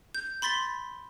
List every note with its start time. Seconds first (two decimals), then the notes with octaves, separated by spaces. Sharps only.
0.15 G6
0.42 B5 C6 A6 B6 G7